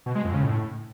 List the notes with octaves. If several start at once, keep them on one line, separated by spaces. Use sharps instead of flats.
B2
G#3
F2
C#3
A2